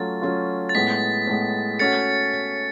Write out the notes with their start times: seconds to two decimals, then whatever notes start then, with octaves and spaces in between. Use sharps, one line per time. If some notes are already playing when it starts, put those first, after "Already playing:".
Already playing: F#3 A3 C#4 F4 A6
0.22 F#3 A3 C#4 F4
0.69 A6
0.75 A2 G#3 B3 B6
1.27 A2 G#3 B3
1.79 A3 C#4 F#4 A6 C#7